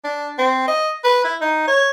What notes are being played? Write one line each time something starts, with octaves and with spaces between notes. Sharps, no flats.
D4
C4
D#5
B4
E4
D#4
C#5